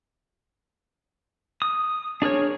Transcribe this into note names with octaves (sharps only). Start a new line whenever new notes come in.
D#6
D4 G#4 A#4 C#5